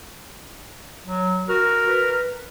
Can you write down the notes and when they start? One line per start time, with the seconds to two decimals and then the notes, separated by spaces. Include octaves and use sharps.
1.07 F#3
1.49 F#4 A#4
1.88 B4